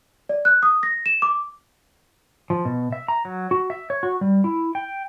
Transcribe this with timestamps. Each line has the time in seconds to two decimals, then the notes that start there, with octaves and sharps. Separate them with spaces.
0.29 D5
0.45 F#6
0.63 D#6
0.83 A#6
1.06 E7
1.22 D6
2.50 F3
2.65 B2
2.92 E5
3.08 A#5
3.25 F#3
3.51 F#4
3.70 E5
3.90 C#5
4.03 F#4
4.21 G3
4.44 E4
4.75 G5